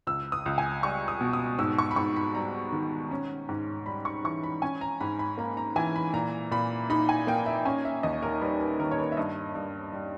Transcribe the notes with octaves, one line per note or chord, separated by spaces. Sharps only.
C#2 E6
D#6
C#2
G#5
G3 C#6
D#6
B2
D#6
G#2 E6
C#6
B5
G#2 C#6
B5
G3 A#5
D#3
C#4
G#2
G3 B5
C#6
E3 C#6
B5
C#4 G#5
A#5
G#2 B5
B5
A#3 A#5
A#5
E3 G#5
B5
A#2 A#5
A#2 B5
D#4 B5
G#5
A#3 G5
E5
C#4 G#5
E5
D#2 D#5
A#4
G3 B4
B4
D#3 A#4
C#5
B4
E5
G2 D#5
G2
G3